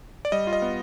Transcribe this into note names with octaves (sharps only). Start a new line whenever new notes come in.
D5
G3 D#5
F4
D#5
B3